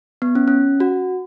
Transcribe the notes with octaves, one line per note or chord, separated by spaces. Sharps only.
B3
C#4
C#4
F#4